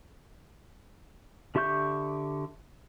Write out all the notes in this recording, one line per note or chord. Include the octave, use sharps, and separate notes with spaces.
D3 G4 E5 C#6 G6